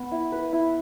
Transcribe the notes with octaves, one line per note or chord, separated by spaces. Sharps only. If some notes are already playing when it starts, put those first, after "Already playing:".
Already playing: B3
E4
B4
E4